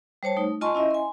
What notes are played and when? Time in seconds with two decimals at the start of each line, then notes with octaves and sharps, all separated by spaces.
0.23 G3 C5 C#5 A5
0.37 A3 D#4
0.61 F4 D#5 G#5 A5 C6 C#6
0.75 C#4 E4 D#5 E5
0.91 G#5 C6